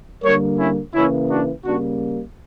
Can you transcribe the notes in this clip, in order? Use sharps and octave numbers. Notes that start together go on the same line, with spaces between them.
D3 G3 A#3 A#4 C#5
C#4 E4
C#3 E3 A#3 C#4 E4
D4 F#4
C#3 G3 A#3 D4 F#4